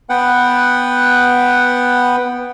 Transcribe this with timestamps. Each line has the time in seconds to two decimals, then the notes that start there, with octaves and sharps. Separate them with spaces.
0.10 B3 B4 F#5 G5